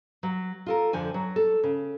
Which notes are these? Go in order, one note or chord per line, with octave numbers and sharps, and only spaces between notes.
F#3
F4 A4 A#4
F2 D3 F3 G#5
F#3
A4
C#3